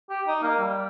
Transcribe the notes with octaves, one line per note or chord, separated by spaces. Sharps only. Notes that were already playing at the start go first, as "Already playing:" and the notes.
G4
D#4
A#3
G3